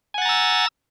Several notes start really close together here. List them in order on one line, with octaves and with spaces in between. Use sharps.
G#5 F#5 A6 A#5 E6